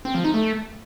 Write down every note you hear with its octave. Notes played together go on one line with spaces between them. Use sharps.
C4
F3
D#4
A3